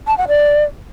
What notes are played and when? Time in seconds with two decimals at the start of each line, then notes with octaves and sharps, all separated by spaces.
0.07 A5
0.18 F#5
0.28 D5